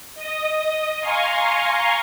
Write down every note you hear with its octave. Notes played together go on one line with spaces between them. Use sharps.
D#5 D#6
F5 G#5 A#5 C6 C#6